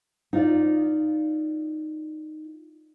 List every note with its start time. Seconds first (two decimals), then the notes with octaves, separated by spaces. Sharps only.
0.33 D#4 F4 D5